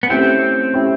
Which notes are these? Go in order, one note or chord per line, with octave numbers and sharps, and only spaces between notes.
B3
A3 C4 C#4 E4 G4
A3 C#4 E4 G4